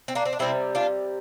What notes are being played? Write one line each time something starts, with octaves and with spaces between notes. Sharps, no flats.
C4
A#3 D4
C4
D4
C3 G3 C4 E4
D4 F4